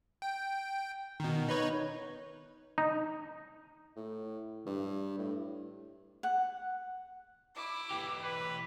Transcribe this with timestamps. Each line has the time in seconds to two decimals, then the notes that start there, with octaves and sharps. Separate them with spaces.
0.22 G5
1.20 B2 D#3
1.49 D#4 B4 C#5
2.78 D#4
3.96 A2
4.67 G2
5.18 A2
6.23 F#5
7.56 E4 D6
7.90 E3 G4
8.22 B4